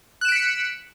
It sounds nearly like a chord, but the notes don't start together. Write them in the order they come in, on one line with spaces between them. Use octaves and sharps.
F#6 E7 D7 B6 C#7